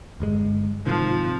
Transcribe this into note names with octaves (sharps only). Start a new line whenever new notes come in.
G1 G2 G#3
G#2 C3 D#3 F3